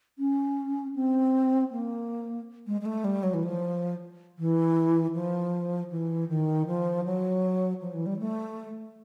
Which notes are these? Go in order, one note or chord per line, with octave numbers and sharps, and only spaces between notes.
C#4
C4
A#3
G#3
G#3
A3
G3
F#3
E3
F3
E3
F3
E3
D#3
F3
F#3
F3
E3
G3
A3